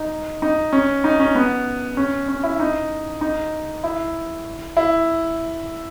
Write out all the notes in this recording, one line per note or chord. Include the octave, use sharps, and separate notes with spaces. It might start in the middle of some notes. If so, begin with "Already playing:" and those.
Already playing: D#4
D#4
C#4
D#4
C#4
B3
C#4
C#4
E4
D#4
D#4
E4
E4